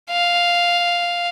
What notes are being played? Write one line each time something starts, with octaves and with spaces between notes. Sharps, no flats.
F5